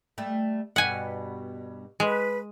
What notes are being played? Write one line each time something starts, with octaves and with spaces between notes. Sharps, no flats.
G3 A3
G2 B2 B3 F#5 G#5
G#3 B4